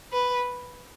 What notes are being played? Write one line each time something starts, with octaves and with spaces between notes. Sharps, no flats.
B4